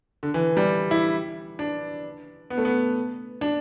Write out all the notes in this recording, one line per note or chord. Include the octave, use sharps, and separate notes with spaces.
D3
E3
G3
E4
D4
B3
A3
B3
D4